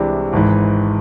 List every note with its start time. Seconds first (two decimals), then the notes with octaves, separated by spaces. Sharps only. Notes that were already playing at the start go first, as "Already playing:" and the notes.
Already playing: C2 C3 E3 G#3 D4
0.33 G#1 G#2 E3 G#3